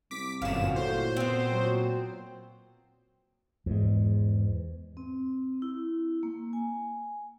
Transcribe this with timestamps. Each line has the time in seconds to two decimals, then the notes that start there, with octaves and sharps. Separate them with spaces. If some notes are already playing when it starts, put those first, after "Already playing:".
0.11 C2 D6 B6
0.42 G1 F#2 A#2 F#4 F5 E7
0.76 A2 C5
1.17 B2 B3 C4
1.51 F#3
3.66 E2 G#2
4.97 C4
5.62 E4
6.23 A#3
6.53 G#5